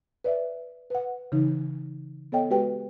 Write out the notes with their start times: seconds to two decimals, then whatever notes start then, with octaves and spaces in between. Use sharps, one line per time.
0.24 B4 D5 E5
0.90 B4 F#5
1.32 C#3 E3 D#4
2.32 B3 A4 C#5 D#5 G5
2.50 G#3 F#4 G4 B4 G5